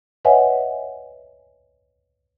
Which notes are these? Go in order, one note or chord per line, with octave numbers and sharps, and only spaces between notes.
B4 C#5 D#5 E5 F#5 G#5